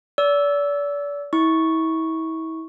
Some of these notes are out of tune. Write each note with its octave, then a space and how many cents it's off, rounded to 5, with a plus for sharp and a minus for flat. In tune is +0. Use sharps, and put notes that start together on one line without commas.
D5 -35 E6 +0
E4 -35 C#6 -5